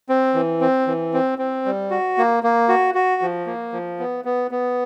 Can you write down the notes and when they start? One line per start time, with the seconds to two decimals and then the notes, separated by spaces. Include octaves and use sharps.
0.09 C4
0.34 E3
0.61 C4
0.87 E3
1.14 C4
1.38 C4
1.66 G3
1.90 F#4
2.18 A#3
2.43 A#3
2.69 F#4
2.95 F#4
3.22 F3
3.47 A#3
3.73 F3
3.99 B3
4.25 B3
4.51 B3